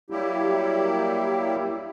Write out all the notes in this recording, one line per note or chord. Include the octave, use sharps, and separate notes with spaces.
F#3 G3 A#3 E4 G4